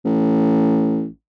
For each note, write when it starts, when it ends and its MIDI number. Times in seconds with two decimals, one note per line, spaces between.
0.05 1.07 33